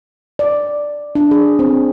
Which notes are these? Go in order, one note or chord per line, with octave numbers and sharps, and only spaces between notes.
D5
D4
G#4
C4